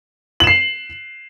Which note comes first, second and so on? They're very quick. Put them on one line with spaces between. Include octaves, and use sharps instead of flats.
F#7 E7 C7